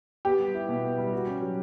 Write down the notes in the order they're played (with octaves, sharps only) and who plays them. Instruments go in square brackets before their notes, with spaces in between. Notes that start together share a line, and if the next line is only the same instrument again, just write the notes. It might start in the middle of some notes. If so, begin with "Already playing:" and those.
[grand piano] B3 [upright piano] G4
[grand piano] G3
E4
B2
B3
G3
F#4
C#4
F#3